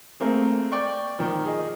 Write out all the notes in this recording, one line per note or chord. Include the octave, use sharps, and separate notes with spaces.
A3 A#3 C4 G#4
D5 G5 C#6
D#3 F3
G#4 D#5